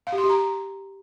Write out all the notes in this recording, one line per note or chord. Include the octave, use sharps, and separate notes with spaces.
F5
G4
C6
G4
A#5